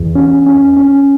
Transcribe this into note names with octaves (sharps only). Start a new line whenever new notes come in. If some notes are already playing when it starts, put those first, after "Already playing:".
Already playing: E2
C#4
C#4
C#4